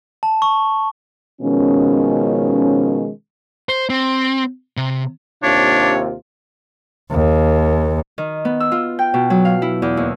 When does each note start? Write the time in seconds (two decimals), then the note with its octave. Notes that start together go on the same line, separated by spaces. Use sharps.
0.23 A5
0.42 C#6
1.42 B2 D#3 F3 G#3 C#4
3.69 C5
3.90 C4
4.77 C3
5.43 D#2 C3 D4 F4 C#5
7.12 D#2
8.18 D#3
8.45 B3
8.60 E6
8.72 F4
8.99 G5
9.14 B2
9.30 F#3
9.45 F5
9.62 E4
9.82 E2
9.97 D#2